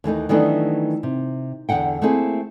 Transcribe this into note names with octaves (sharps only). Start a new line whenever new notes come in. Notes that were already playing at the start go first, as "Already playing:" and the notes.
D#2 E3 A3 D#4
D#3 E3 F#3 A3 B3 D4
C3
E2 G#2 D3 F#5 G5
A3 A#3 C4 E4 G#4